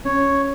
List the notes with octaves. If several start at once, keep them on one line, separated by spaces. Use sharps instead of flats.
C#4 C#5